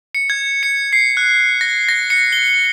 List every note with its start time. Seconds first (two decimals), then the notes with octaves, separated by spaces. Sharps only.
0.15 C#7
0.30 G#6
0.63 C#7
0.93 C7
1.17 F#6
1.61 A#6
1.89 A#6
2.10 C#7
2.33 G7